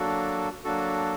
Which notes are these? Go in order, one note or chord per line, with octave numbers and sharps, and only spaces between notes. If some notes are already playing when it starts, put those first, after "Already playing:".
Already playing: F#3 A#3 D4 F#4 A4
F#3 A#3 D4 F#4 A4